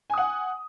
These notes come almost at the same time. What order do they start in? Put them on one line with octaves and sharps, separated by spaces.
G#5 D#6 F#5